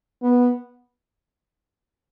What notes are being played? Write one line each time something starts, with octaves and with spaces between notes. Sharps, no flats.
B3